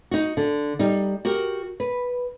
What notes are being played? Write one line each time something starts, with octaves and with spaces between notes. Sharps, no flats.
D#4 F#4
D3
G3 D#4
F#4 G4 A#4
B4